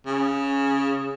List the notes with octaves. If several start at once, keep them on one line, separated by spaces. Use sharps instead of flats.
C#3